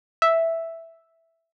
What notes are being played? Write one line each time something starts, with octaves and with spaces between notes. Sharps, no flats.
E5